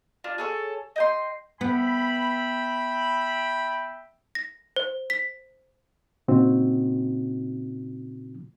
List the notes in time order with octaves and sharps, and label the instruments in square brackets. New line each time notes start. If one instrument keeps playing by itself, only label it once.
[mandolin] D4 F4
G#4 A4 C#5
D#5 G5 C6
[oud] B3 [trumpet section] E5 G5 B5
[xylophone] A#6
C5
B6
[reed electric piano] A#2 C#3 C4 D#4 F#4